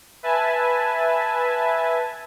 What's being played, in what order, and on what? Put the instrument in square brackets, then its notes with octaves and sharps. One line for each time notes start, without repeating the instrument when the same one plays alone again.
[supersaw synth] B4 E5 G#5 A5